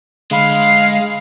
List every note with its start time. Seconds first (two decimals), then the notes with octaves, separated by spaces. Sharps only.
0.31 D3 G#3 F5 B5